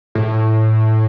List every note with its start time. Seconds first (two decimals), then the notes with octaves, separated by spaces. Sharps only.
0.15 A2